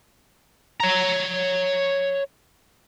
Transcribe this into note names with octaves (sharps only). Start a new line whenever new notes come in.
C#5 A#5